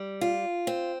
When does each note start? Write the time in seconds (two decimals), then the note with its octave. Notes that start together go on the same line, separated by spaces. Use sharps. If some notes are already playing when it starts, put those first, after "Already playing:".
Already playing: G3
0.21 F4
0.67 C4